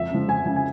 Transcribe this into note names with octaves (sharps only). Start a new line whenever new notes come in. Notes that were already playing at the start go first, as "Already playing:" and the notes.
Already playing: F2 E5
C#3 F3
F2 G#5
C#3 F3 G#5
G#5